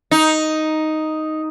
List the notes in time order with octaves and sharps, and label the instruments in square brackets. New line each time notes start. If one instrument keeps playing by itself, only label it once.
[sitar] D#4